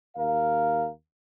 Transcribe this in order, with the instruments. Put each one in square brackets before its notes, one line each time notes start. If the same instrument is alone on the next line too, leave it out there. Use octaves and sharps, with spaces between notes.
[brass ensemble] D#2 A#4 F5